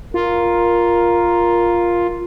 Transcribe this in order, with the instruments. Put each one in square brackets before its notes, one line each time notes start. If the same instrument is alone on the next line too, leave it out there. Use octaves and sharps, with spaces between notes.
[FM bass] F4 [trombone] A#4